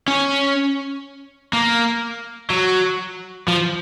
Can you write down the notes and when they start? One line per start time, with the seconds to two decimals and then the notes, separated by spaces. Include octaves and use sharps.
0.08 C#4
1.53 A#3
2.50 F#3
3.48 F3